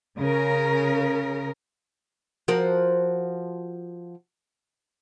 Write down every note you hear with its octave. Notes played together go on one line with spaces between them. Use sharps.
C#3 A#4
F3 F#4 A#4